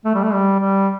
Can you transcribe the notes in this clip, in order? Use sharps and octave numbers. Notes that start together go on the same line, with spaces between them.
A3
G3
A3
G3
G3